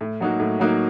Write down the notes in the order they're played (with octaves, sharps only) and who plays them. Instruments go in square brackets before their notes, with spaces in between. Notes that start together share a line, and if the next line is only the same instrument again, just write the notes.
[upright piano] A2
F#3 A#3 D#4 F#4
A2
F#3 A#3 D#4 F#4